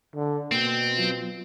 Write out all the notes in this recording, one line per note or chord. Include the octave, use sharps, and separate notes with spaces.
D3
B2 A#3 C4
F#3 B3 F4